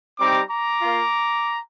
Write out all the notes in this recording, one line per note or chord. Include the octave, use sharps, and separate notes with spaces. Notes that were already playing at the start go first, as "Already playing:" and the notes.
G3 C4 D#4 G4 A#5 D6
A#5 D6
A#3 F4